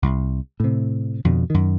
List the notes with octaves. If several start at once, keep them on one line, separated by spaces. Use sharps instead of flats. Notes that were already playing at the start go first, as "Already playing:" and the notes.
C2
A2 C3
F2 B2 D3
F#2 D#3